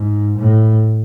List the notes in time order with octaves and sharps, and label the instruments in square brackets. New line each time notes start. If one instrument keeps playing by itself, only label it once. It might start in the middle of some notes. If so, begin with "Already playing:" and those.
Already playing: [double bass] G#2
A2